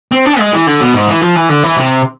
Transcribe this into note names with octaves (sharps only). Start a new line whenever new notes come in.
C4
D4
G#3
E3
D3
B2
G#2
E3
F3
E3
D3
E3
C3